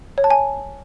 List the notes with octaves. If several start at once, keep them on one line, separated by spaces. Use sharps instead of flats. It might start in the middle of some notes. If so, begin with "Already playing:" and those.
C#5
A5
G#5